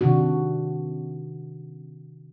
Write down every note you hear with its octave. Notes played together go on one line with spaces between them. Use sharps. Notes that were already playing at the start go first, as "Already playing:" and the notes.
C3 D#3 D4 F#4